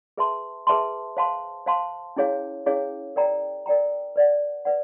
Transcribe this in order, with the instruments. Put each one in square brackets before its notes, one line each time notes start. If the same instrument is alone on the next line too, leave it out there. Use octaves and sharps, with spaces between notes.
[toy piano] G#4 B4 E5 A5 C6
G#4 B4 E5 A5 C6
C5 F5 A5 C6
C5 F5 A5 C6
C#4 E4 G#4 C#5 F5
C#4 E4 G#4 C#5 F5
A#4 D5 G5 A#5
A#4 D5 G5 A#5
B4 D5 F#5
B4 D5 F#5